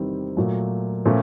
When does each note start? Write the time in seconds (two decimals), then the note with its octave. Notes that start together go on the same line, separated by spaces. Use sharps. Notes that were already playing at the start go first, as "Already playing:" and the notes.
Already playing: E2 C3 D#3 G3 C4
0.37 A#2 F#3 A3
1.06 A#2 F3 A3 C#4